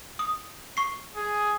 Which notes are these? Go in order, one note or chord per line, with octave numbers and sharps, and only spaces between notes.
D#6
C#6 C7
G#4